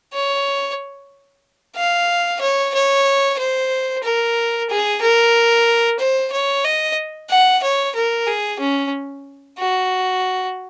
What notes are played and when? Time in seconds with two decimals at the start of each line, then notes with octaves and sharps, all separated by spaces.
0.14 C#5
1.76 F5
2.41 C#5
2.74 C#5
3.39 C5
4.04 A#4
4.70 G#4
5.01 A#4
5.99 C5
6.32 C#5
6.64 D#5
7.29 F#5
7.63 C#5
7.95 A#4
8.27 G#4
8.60 C#4
9.58 F#4